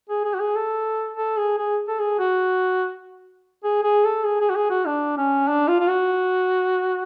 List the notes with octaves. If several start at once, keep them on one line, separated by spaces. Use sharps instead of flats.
G#4
G#4
F#4
G#4
A4
A4
G#4
G#4
A4
G#4
F#4
G#4
G#4
A4
G#4
G#4
F#4
G#4
F#4
D4
C#4
D4
F4
F4
F#4